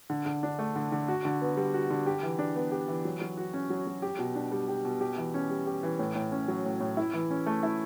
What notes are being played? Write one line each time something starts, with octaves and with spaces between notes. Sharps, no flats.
D3
D3
D4
A3
D3
D3
F#4
D3
B3
G3
F#4
D3
G4
E3
D4
B3
G4
E3
F#3
F#3
F#4
C#4
F#3
F#3
G4
B2
D4
G3
G4
B2
G4
E3
C#4
G3
G4
E3
A2
A2
C#4
F#3
A2
A2
E4
E3
C#4
A3
E4